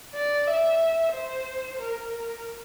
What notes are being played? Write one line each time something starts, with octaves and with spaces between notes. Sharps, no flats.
D5
E5
C5
A#4
A#4